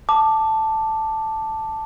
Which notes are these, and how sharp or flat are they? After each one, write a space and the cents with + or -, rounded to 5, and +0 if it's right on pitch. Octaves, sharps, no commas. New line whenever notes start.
A5 +0 D6 +10